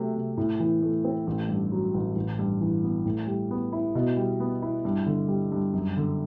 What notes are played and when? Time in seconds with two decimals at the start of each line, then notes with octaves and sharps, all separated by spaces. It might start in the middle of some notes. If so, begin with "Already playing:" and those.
Already playing: C3 F#3 A3
0.14 C3
0.37 A2
0.60 E3
0.82 A3
1.04 C4
1.27 A1
1.49 G2
1.72 F#3
1.94 A1
2.16 A1
2.39 G2
2.61 E3
2.83 B3
3.06 A2
3.27 G3
3.51 B3
3.72 E4
3.95 B2
4.17 G3
4.40 B3
4.62 E4
4.85 G2
5.06 D3
5.28 G3
5.52 G2
5.73 F#2
5.97 D3